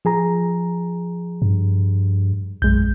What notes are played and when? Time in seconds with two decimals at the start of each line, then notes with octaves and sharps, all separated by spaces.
0.05 F3 G#4 A#5
1.42 G2
2.62 A#1 F#2 G#3 G6